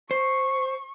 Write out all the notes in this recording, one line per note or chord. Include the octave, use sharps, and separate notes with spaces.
C5 C#6